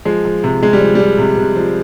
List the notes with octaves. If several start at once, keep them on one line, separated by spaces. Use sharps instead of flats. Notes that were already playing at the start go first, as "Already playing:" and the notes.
F3 G#3
F3
C3
C3 G#3
G3
F3
F3 G3
C3
C3
F3